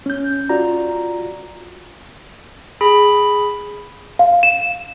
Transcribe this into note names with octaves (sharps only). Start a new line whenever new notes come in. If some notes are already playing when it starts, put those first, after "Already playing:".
C#4 G6
F4 F#4 D5 A#5
G#4 B5
F5
E7